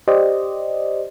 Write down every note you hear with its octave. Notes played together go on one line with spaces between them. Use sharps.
G4 C5 D5 D#5